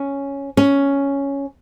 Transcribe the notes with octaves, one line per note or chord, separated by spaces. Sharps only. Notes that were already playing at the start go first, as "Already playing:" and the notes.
Already playing: C#4
C#4